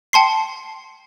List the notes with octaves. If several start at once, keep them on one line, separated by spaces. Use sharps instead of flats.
G5 A5 C6 C7